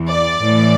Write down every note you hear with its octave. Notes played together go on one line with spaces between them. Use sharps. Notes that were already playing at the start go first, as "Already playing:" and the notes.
Already playing: E2 E3
D5
A2 E3